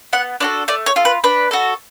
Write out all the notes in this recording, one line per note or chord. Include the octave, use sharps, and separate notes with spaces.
B3 F#5
D4 F#4 A4 D5
A3 D5
C#5
F4 A4
B4
D4 B4
F#4 A4